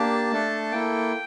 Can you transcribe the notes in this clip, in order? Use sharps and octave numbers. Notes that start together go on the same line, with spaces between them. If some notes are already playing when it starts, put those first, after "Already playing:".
Already playing: A#3 D4 G4 A5
A3 D4 A4
A#3 E4 A4 G5